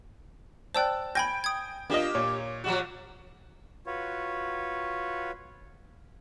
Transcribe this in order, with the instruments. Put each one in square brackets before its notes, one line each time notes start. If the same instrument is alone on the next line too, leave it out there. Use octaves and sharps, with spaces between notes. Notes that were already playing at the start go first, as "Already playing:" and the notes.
[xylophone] C5 D5 G5 [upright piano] A5 E6 F#6
[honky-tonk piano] G5 G6 [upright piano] G#5 [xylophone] B5 G#6 A#6
[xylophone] D#6 G#6
[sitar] A#3 G4 [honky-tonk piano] D4 F4 D#5
[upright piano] A#2 [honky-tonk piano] C#5
[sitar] F3 G3 F#4
[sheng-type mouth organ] F4 F#4 B4 C#5